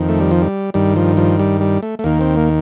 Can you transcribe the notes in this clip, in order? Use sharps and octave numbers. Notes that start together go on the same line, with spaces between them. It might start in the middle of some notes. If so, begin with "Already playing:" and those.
Already playing: F2 D#3
A3
G3
F3
G3
G2 D#3 G3
F3
F3
G3
G3
A3
A3
D#2 D#3 A#3
C4
A#3